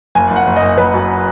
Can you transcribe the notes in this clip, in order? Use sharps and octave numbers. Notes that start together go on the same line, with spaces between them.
F#1 G#5
F#1 F#5
F#1
D#5
F#1
F#1 B4
F#2